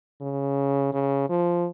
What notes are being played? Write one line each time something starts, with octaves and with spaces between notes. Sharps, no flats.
C#3
C#3
F3